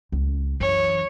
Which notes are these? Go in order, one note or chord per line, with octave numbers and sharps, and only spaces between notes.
C#2
F#2 E3 C#5